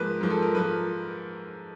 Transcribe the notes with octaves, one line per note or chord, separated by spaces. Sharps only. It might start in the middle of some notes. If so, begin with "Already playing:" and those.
Already playing: G#2 F3 A#3 B4
G#2 F3 A#3
A4
A#4
G#2 F3 A#3 B4